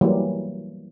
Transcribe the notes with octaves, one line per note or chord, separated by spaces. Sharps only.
E3 F#3 G3 A#3